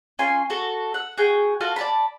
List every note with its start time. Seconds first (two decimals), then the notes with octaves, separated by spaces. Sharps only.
0.19 C#4 F4 G#5 C6
0.50 F#4 A4
0.94 F#5 E6
1.18 F#4 G#4 G5
1.61 F4 F#4 A4 F6
1.76 D5 A5 B5